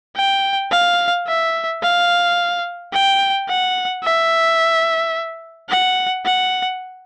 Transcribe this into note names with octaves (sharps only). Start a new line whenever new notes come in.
G5
F5
E5
F5
G5
F#5
E5
F#5
F#5